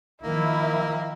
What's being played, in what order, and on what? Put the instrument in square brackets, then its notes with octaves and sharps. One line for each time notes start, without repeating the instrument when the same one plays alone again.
[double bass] D#3 F3 [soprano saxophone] A#3 [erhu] E4